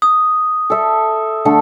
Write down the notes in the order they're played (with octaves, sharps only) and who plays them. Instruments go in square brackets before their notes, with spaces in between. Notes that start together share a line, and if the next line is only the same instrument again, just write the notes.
[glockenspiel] D#6
[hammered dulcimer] A4 E5
D3 A3 A4